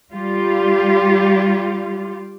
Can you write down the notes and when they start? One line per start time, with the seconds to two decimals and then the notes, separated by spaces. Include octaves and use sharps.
0.12 G3 F4 G4